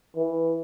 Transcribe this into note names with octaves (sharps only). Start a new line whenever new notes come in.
E3